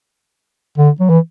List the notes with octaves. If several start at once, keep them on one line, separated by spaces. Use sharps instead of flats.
D3
F#3
E3